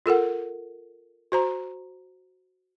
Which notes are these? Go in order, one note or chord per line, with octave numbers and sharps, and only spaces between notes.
F4 A4 A#4 F#5
F#4 C5 A#5